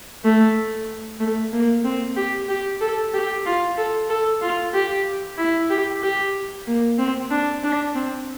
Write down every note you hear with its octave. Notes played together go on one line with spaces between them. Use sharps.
A3
A3
A#3
C4
G4
G4
A4
G4
F4
A4
A4
F4
G4
E4
G4
G4
A#3
C4
D4
D4
C4